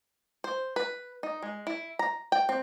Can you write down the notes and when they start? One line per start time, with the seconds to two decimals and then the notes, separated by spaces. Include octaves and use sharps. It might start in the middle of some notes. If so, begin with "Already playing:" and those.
0.44 C5
0.76 B4
1.23 D#4
1.43 G#3
1.67 E4
1.99 A#5
2.32 G5
2.49 C4